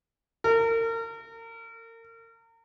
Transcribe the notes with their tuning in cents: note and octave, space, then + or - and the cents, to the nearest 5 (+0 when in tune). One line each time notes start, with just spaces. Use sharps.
A#4 -35